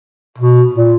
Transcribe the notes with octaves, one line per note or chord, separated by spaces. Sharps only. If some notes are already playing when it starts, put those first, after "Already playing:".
B2
A#2